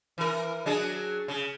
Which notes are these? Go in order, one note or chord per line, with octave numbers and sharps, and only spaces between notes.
E3 A#4
F#3 D4 G#4
C#3